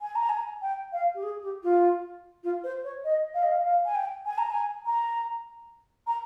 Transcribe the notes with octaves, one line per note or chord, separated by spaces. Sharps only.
G#5
A#5
G#5
G5
F5
G4
G#4
G4
F4
F4
C5
C#5
D#5
F5
D#5
F5
F5
G#5
G5
G#5
A#5
G#5
A#5
A#5